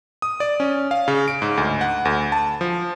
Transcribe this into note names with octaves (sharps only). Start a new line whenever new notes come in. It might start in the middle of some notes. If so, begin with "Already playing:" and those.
D#6
D5
C#4
F5
C#3
D7
G#2
D2
F#5
D2
A5
F3